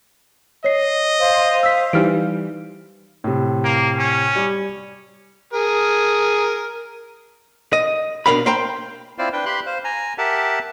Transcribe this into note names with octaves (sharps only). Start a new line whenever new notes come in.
C#5 D#5 C7
C5 F5
E6 B6
E3 G3 D#4 F6 D7
A2 C3
A#3
C#4
G3
G#4 A#4
D#5
B2 G#3 D4 A#4 F5 B5
C5 F5 G5 A#5 C6
C4 E4 F4 C5 D5 F5
D4 B4 G5
G4 B5 C6 F#6
C5 F5
G#5 A#5
G4 A#4 E5 F#5 A5